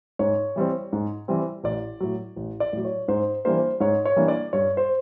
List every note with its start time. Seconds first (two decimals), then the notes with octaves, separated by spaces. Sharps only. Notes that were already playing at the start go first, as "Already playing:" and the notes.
0.19 G#2 C#5
0.56 E3 G3 C4
0.93 G#2
1.28 E3 G3 C4
1.64 A1 D5
2.00 A2 F#3
2.36 A1
2.60 D5
2.73 A2 F#3
2.85 C#5
3.08 G#2 C5
3.45 E3 G3 A#3 D4 C5
3.80 G#2 C#5
4.05 C#5
4.16 E3 G3 A#3 D4
4.28 D5
4.53 G2 C#5
4.77 C5